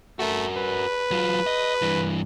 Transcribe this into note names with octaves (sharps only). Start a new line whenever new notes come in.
A3 F#4 A#4
B4
F#3 F4
D#5
G2 E3